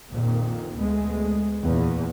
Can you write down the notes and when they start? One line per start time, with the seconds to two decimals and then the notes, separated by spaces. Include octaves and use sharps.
0.13 A#1 F2 A#2 D#3 A#3
0.77 D2 G#3 A3 B3
1.63 E2 A#2